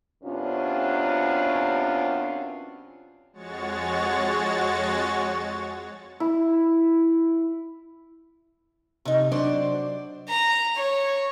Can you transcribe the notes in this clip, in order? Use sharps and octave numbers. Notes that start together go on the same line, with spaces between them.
F#2 C3 B3 C#4 D4 F4
F2 G#3 F#4 C#5 C#6 A6
E4
C3 D#4
F#3 D4 C5 D5
A#5
C#5